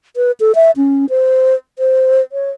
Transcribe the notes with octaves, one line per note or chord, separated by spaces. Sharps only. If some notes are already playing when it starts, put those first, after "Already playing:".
B4
A4
E5
C#4
C5
C5
C#5